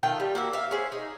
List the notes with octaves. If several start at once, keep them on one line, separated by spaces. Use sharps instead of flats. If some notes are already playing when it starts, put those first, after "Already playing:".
D#3 A3 F4 G5
G3
A#3 F#4 E5
E5 F5
C#4 G#4 C5
D#4